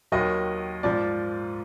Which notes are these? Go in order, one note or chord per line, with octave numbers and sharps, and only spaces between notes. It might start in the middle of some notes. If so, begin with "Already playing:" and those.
D#2 D#3 F#3 D#5
G#2 F3 D5